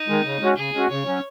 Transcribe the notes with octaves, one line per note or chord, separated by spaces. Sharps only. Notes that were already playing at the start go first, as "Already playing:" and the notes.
Already playing: D#4
D#3 G#3
C#3
G#3 C#4 F#4
C#3 G#4
G#3 C#4 F#4
C#3 C#5
F#3 C#4